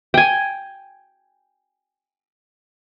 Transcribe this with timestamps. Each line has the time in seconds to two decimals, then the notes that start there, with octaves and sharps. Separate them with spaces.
0.14 G5 G#5